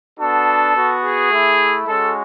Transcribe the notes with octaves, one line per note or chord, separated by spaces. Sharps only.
B3 D4 F#4 A4
B3 F#4
G#4
A3 E4
G#3 C#4 F#4 A4